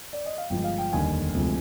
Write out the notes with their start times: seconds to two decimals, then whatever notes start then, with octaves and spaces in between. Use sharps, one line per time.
0.13 D5
0.26 D#5
0.38 F5
0.50 G1 G2 F3 G#3 G5
0.64 F5
0.78 G5
0.92 F1 D#2 D3 G3 G#5
1.34 D2 C3 F3 G#3